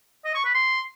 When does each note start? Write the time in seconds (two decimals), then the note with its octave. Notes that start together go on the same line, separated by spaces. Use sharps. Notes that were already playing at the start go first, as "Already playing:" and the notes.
0.25 D#5
0.35 C#6
0.44 B4
0.54 C6